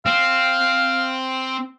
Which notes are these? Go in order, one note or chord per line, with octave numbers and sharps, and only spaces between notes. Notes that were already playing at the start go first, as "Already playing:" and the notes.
C4 F5